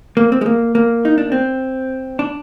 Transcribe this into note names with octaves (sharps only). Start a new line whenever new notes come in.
A#3
C4
G#3
A#3
A#3
D#4
D4
C4
D4